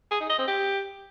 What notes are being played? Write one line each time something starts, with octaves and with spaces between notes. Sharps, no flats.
G#4
D#4
D#5
C4
G4